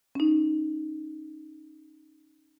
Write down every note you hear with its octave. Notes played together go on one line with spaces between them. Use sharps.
C#4 D#4